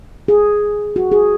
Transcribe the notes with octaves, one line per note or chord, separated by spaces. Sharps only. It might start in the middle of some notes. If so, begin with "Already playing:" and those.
G#4
F#4
G#4